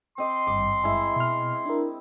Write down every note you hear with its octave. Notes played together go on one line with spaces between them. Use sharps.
C4 D#5 C6 D6
G#1 G2 D6
G#3 E4 E5
B2 F6
D4 E4 A#4